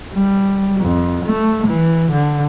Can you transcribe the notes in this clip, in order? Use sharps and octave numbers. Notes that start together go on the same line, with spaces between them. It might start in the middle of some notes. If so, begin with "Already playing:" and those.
G3
F2
A3
E3
D3